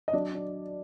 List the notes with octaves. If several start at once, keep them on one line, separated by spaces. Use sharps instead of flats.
D#5
F#3 D4 D5
D4